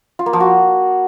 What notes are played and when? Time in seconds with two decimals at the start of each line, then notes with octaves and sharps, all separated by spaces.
0.19 F4
0.26 A#3
0.33 F3
0.40 F#4